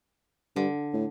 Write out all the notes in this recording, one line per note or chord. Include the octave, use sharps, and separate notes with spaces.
G2 D3
A2